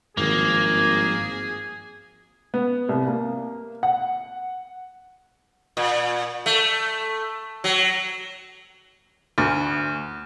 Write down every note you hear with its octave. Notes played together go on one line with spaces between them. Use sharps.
G#1 G2 D#3 F3 A#3 G#4
B3
C2
A#3
F#5
A#2
A3
F#3
D2